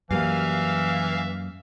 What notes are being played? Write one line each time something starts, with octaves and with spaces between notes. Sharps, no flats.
F#2 E3 G3 A#3 E5 F5